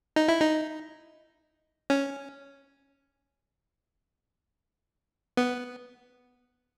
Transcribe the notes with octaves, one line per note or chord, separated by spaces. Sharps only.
D#4
E4
D#4
C#4
B3